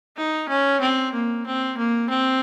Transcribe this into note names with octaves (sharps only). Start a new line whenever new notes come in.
D#4
C#4
C4
A#3
C4
A#3
C4